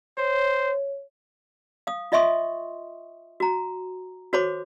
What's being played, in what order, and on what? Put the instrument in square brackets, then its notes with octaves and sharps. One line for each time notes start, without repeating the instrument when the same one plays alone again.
[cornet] C5 [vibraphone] C#5
[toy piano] F5 D#6
F4 D#5 E5 C6 C#6 D#6
F#4 A#5
F#4 A4 C5 C#5 B5 D6